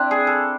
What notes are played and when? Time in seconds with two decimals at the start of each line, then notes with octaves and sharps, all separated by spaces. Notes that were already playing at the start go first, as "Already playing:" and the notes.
Already playing: C4 D4 E4
0.11 G#4
0.27 A4